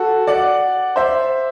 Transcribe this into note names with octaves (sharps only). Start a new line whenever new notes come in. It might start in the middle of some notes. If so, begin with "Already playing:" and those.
Already playing: F#4 A4
D5 F#5
C5 E5